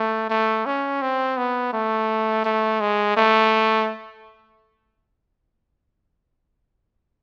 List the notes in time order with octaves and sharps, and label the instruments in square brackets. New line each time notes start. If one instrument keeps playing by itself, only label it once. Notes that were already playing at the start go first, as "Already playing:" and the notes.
Already playing: [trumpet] A3
A3
C#4
C4
B3
A3
A3
G#3
A3